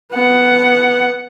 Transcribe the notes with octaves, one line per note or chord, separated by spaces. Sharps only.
B3 F#5